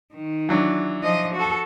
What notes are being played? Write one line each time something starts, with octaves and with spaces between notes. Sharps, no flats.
D#3
E3 F#3 D4
F3 D#5
F#4 A4